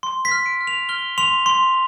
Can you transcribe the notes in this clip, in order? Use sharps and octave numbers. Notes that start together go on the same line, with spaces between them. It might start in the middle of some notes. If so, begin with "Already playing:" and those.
C6
B6
F6
D7
F6
F7
F6 G7
C6 F7
C6